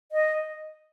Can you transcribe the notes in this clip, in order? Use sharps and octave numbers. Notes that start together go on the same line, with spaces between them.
D#5